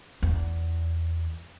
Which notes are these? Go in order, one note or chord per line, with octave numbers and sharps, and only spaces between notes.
E2